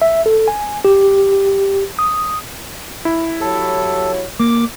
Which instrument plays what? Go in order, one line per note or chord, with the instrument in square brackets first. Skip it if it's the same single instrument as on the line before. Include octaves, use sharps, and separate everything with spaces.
[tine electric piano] E5
A4
G#5
G4
D#6
[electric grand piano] E4
[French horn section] F#3 G4 C#5 [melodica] A4
[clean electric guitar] A#3 [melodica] D6